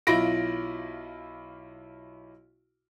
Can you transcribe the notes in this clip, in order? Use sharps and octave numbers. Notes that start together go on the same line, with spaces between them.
B1 E4 F4 B5 A#6 D7